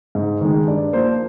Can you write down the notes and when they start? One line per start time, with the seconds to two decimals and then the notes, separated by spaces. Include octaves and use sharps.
0.15 G#2
0.41 D#3 G#3
0.67 G2 D5
0.93 F3 A#3 C5